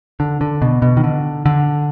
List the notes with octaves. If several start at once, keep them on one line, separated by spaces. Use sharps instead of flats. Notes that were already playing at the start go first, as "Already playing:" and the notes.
D3
D3
B2
B2
D#3
D3
D3